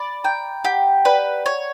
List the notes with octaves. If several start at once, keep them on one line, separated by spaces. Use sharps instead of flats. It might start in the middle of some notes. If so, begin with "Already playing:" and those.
Already playing: D5 B5
G5 A#5
G4 F#5
B4 D5
C#5